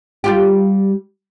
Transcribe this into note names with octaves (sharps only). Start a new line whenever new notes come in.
G3 F4 G4